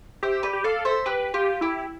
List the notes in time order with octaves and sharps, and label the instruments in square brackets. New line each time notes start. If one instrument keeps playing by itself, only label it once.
[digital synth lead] G4 [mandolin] C5 E5
[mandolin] B4 D5
[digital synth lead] G4
[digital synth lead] A4 [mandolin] D5 F5
[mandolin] C5 E5
[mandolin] G4 [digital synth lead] B4
[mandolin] F4 [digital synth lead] G4
[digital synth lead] E4 [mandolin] G4